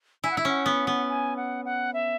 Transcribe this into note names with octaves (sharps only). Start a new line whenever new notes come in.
E4 G#5
F#5
E4 E5
C#4 F#5
B3
B3
G#5
F#5
F#5
E5